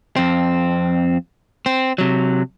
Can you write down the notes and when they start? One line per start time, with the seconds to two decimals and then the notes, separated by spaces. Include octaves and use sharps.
0.16 F2 C4
1.66 C4
1.98 C3 F#3